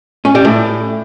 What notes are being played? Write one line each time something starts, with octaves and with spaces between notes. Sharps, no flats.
C#4
G3
A2